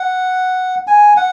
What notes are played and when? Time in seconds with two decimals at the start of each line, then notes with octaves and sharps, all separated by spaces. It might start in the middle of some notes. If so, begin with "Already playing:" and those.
Already playing: F#5
0.87 G#5
1.17 F#5